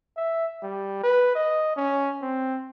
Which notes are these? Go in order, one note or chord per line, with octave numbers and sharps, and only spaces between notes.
E5
G3
B4
D#5
C#4
C4